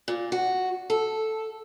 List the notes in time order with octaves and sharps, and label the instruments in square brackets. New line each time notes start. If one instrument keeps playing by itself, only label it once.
[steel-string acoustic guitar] A#2
F#4
A4